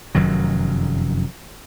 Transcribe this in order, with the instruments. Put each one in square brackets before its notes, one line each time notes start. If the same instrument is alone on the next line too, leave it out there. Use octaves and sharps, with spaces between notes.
[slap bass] F1 F#2 D#3 F#3